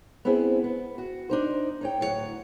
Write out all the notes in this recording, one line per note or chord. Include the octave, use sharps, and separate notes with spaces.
B3 C4 D4 E4 G#4 C5
B3
F#4
D4 D#4 C5
D#4 C#5 G5
D2 A2 F#3 F4 C#5 F#5